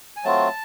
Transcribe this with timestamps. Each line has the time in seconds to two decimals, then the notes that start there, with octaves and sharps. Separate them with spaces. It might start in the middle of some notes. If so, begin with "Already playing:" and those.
0.16 G#5
0.24 F#3 A3 C4 F4 A5